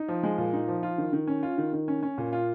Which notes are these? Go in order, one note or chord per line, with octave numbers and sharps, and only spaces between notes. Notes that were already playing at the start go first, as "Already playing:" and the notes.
Already playing: D#4
F3
G#3
A#2
D#4
F3
F4
D#3
D#3
C#4
F4
D#3
D#3
C#4
C#4
A#2
F4